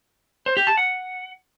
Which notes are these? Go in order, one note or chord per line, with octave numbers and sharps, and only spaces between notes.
C5
G4
A5
F#5